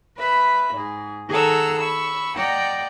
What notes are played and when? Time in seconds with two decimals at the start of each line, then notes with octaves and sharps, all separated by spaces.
0.17 B4 E5 B5
0.75 G#2 G#4
1.30 D#3 G#4 A4 F#5 A#5 E6
1.78 B5 C#6 E6
2.36 D5 D#5 F#5 G5 A#5